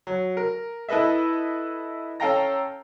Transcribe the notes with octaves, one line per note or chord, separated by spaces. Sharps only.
F#3
A#4
E4 A4 B4 D#5 E5
C#4 A4 F5 G5 A#5 A#6